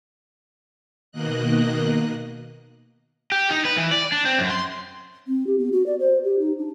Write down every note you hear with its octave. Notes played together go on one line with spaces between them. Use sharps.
B2 D#3 A#3 D#5 F#6
G4
D#4
B4
E3
D5
D4
C4
F#2
C6
C4
G4
B3
F#4
D5
C5
G4
D#4
D4